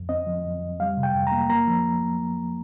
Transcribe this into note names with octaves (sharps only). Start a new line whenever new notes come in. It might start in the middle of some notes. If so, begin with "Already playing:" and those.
Already playing: F2
C4 D#5
F3
F2
F2
G3 F5
C3
G5
F2
A#3 A#5
A#3 A#5
F3